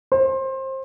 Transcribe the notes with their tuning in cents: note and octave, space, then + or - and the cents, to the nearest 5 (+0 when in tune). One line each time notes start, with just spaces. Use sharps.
C5 +25